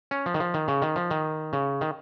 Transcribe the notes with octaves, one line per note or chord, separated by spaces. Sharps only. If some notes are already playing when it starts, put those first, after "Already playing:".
C#4
F3
D#3
F3
D#3
C#3
D#3
F3
D#3
C#3
D#3